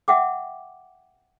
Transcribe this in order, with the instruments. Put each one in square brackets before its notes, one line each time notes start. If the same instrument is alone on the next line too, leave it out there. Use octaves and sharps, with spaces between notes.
[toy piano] E5 F#5 G5 D6